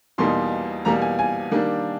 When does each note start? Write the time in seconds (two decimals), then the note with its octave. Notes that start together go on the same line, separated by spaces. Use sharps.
0.18 E2 B2 G3 A#3 D#4 C6
0.85 E2 B2 G3 A#3 A#5
1.02 G#5
1.19 G#5
1.51 D#3 G3 A#3 D4